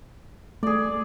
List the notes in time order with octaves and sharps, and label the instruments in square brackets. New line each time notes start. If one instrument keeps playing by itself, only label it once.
[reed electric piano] A3 [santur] G#4 D5